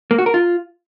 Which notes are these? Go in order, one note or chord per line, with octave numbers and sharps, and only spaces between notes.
A#3
F#4
A#4
F4